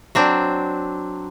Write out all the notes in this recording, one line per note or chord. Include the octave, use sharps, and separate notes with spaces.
F#3 C4 D4